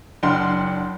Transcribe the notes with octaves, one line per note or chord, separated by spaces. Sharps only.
F#1 D4 F#5 G5 C6 F6